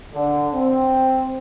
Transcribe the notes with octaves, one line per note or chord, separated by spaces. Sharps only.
D3
C4